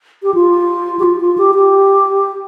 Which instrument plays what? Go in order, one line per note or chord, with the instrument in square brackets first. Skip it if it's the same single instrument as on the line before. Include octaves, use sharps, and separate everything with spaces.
[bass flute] G4
F4
G4
F4
F4
G4
G4